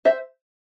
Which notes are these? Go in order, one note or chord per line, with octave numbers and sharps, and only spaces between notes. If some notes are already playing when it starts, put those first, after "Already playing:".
C5 E5